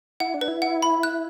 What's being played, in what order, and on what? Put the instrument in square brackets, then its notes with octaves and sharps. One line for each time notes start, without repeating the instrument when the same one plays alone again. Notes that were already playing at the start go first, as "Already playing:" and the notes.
[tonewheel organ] E4 [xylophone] F#5
[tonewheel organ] D4
[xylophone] B4
[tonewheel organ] E4
[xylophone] F#5
B5
F#6